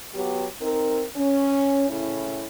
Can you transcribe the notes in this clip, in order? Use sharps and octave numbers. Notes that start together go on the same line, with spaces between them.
F#3 B3 G4
C4 D#4 A#4
C#4
A2 C#3 C#4 E4